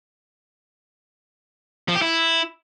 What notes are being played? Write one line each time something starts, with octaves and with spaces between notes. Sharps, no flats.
F3
G4
E4